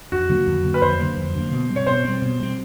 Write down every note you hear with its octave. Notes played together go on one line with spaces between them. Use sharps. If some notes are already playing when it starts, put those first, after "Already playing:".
F2 F#4
D3 F#3 A#3
F2
D3 F#3 A#3
B4
F2 C5
D3 F#3 A#3
F2
D3 F#3 A#3
B2
G3 C4
C#5
B2 C5
G3 C4
B2
G3 C4